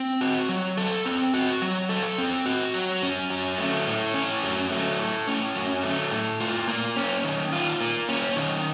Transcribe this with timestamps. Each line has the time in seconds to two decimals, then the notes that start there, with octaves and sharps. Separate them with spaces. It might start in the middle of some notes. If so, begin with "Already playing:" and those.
Already playing: C4
0.21 F#4
0.49 F#3
0.77 A4
1.06 C4
1.34 F#4
1.62 F#3
1.89 A4
2.18 C4
2.46 F#4
2.74 F#3
3.03 C#4
3.30 F#3
3.58 A3
3.87 A2
4.14 C#4
4.43 F#3
4.71 A3
4.99 A2
5.28 C#4
5.55 F#3
5.83 A3
6.11 A2
6.40 F4
6.68 A#3
6.96 C#4
7.24 D#3
7.52 F4
7.80 A#3
8.09 C#4
8.36 D#3